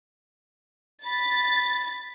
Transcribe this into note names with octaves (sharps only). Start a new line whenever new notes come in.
B5 A6